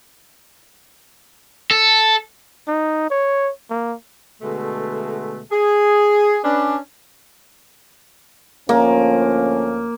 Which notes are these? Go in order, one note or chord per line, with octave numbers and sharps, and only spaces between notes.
A4
D#4
C#5
A#3
B2 D3 G#3 A3
G#4
C#4 D4 B4
D2 F3 A#3 C#4